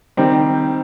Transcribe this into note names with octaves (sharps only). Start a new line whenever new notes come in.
D#3 G3 C4 D#4 G4